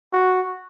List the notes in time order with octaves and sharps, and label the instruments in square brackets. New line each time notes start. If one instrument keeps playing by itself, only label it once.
[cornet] F#4